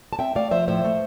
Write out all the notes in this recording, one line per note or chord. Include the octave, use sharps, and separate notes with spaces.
A5
C4 E5 G5
A3 D5 F5
F3 C5 E5
A2 C5 E5
A3